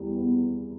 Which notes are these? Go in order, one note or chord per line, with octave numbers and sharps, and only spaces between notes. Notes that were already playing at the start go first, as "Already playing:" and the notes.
Already playing: E2 G3
B3